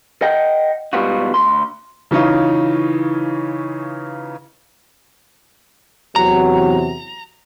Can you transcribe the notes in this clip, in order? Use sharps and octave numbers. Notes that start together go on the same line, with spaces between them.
D#5 F#5 G5
G#2 B2 G3 B3 F4 F#4
D2 C6
C#3 E3 C#4 D#4 F4
E2 C3 F#3 A#5